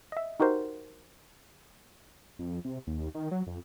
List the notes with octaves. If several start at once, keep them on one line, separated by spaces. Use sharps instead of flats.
D#5 E5
D#4 F#4 G4 A#4 C5
F2
C3
D#2
D#3
F#3
F2